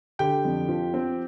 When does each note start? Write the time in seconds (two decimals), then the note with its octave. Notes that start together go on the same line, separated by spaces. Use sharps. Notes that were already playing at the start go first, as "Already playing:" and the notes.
0.19 D3 G4 G5
0.44 F2
0.69 F3
0.94 C4